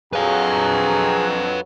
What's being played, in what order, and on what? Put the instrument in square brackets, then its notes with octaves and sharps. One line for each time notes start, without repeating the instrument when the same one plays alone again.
[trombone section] F2 F#3 [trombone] G#4 [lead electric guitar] B4 F5 [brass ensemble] A#5